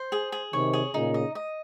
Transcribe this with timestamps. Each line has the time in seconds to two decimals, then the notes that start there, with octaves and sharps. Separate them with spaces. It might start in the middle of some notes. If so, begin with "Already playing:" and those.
Already playing: C5
0.12 G#4
0.32 G#4
0.53 C3 D#3 C#5
0.73 G#4
0.94 A#2 C#3 D#4
1.14 D#5
1.35 D#5